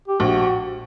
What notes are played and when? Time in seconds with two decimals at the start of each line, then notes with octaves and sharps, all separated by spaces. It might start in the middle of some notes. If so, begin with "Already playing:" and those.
0.08 G4
0.20 A#1 F#4